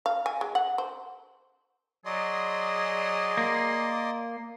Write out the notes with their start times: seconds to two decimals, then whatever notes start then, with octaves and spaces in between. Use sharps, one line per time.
0.06 F5
0.26 G#5
0.41 G#3
0.55 F#5
0.78 C5
2.05 F#3 G#4 D5 D#5 C6
3.37 A#3